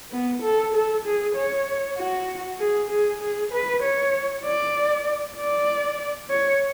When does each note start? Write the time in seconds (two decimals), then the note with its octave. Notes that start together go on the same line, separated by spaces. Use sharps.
0.12 B3
0.43 A4
0.74 A4
1.05 G#4
1.35 C#5
1.97 F#4
2.59 G#4
2.90 G#4
3.22 G#4
3.53 B4
3.83 C#5
4.44 D5
5.38 D5
6.30 C#5